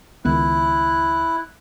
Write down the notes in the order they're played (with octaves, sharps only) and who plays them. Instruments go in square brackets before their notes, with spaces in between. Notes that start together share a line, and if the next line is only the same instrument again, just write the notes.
[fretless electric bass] C#2 D#3 B3 [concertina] E4 F#6